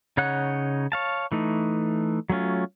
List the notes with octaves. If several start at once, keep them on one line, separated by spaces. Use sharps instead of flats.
C#3 D#4 C#5 F#5 F#6
C#5 F5 A5
E3 A3 D#4
F#3 A3 C#4 F4